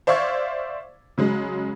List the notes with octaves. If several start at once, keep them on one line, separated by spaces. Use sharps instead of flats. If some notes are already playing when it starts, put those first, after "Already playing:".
C5 D5 E5 F5 C#6 G#6
C#3 F#3 G#3